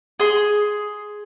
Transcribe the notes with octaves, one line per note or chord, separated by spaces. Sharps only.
G#4 C6